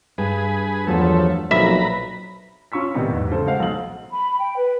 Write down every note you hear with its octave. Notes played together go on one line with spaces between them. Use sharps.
G2 G#4 B4
E2 F3 F#3 A3
B1 F2 A#2 B4 E5 A#5 B5
C#4 F4 C#6 E6 B6
A2 C3 D#3 G3 B3 D#4
E2 G#2
C#3 A4 C5
G#3 C5 F5 F#5
B1 F#5 F#7
B5
G5
B4